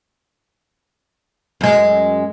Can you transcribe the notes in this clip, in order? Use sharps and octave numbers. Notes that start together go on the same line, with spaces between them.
F#2 G#3